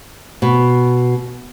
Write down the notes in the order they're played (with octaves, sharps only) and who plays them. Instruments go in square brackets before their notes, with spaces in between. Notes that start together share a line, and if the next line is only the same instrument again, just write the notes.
[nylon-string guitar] B2